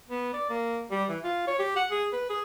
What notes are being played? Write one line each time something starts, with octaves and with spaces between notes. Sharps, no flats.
B3
D5
A#3
G3
E3
F4
C#5
G4
F#5
G#4
B4
G#4